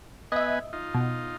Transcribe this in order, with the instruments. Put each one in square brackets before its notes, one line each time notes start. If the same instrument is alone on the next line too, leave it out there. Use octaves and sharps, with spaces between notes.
[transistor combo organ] B3 B4 G#5 [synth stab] D#5 E5
[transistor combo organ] D#4 F4
[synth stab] B2